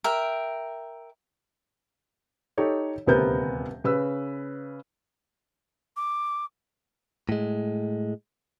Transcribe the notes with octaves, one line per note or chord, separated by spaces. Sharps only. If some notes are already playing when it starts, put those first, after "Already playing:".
A#4 E5 G5
D#4 G4 A4 C#5
D#1 D2 C3 B3 A#4 G6
C#3 B4 E6
D6
A2 G#3